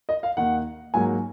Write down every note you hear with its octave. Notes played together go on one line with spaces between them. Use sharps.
D#5
F5
D#2 D#3 A#3 F#5
G#2 F#3 A#3 G#5